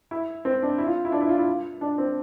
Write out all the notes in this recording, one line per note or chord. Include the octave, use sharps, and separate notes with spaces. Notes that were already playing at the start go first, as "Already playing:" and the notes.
E4
C4
D4
E4
F4
E4
D4
E4
F4
E4
D4
C4